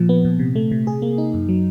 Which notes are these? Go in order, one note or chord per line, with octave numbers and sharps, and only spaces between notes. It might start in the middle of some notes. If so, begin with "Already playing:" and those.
Already playing: A#2 F3
B3
A#2
C3
A3
C3
G#4
A#3
D#4
F#2
F#3